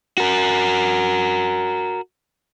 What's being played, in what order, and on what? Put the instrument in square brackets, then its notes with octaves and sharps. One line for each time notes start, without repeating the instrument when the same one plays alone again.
[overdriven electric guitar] F#4 A#4